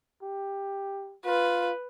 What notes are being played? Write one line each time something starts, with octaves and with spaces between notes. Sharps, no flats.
G4
F4 B4